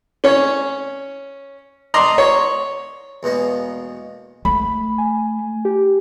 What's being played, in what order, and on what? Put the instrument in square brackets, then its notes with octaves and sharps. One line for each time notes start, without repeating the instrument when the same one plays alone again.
[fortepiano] C#4 C#5
D5 D#5 A#5 C6
C#5
[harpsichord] E2 B2 G#3 A#3
[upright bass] A3 [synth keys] B5
[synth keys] G#5
G4